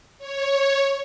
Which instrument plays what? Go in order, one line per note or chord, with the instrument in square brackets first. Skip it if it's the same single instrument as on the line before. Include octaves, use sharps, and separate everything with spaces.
[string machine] C#5